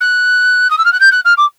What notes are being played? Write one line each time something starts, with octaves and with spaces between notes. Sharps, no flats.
F#6
D#6
E6
F6
F#6
G6
F#6
F6
D6